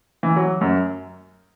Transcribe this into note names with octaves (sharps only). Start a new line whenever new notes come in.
E3
F#3
F#2